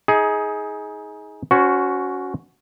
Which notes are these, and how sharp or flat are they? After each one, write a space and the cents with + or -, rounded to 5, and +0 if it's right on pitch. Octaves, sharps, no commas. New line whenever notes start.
D#4 +30 G#4 +10
C#4 +15 F#4 +0 C5 -20